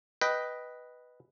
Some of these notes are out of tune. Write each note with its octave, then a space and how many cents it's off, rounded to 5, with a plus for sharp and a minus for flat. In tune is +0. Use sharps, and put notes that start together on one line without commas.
B4 +0 D#5 +0 G5 -5